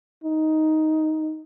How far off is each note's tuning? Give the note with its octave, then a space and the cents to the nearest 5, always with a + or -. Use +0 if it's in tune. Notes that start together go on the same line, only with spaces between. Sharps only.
D#4 +5